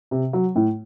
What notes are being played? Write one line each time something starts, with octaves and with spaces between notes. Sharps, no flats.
C3
F#3
A2